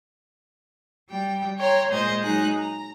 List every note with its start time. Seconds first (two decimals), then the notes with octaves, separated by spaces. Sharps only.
1.08 G3 G5
1.58 C#5 G5 A#5 C6
1.90 A#2 G#3 C5 D#5 G#6
2.23 F#3 G#3 D#4 G#4 F#6
2.57 A#5